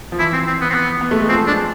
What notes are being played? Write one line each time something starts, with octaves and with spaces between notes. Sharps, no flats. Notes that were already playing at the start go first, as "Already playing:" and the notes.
F3
E3 E4
C4
C4
B3
C4
B3
B3
A3
G#3
F3 C4
G#3 D4